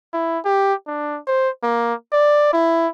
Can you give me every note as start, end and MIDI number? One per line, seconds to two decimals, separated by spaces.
0.13 0.39 64
0.45 0.74 67
0.87 1.19 62
1.27 1.49 72
1.63 1.94 58
2.13 2.49 74
2.53 2.88 64